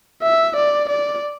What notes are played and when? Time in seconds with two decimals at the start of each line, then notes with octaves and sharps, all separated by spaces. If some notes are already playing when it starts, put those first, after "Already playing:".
0.22 E5
0.56 D5
0.89 D5